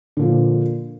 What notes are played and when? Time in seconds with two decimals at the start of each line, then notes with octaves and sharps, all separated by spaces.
0.17 D3
0.19 A#2
0.22 F3